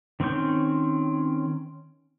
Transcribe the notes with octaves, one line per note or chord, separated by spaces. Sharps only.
D#3 C4 C#4 C#6 G6